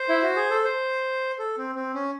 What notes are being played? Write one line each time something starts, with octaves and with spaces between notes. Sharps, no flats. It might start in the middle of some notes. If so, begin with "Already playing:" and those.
Already playing: C5
E4
F#4
G#4
A4
C5
A4
C4
C4
C#4